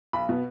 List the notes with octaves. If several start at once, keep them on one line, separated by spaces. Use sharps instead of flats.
B1 B5
B2 B3